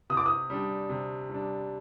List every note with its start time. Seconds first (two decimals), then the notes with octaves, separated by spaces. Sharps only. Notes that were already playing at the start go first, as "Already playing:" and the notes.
0.10 C3 D#6
0.17 D6
0.26 D#6
0.50 G3 D4
0.89 C3
1.29 G3 D4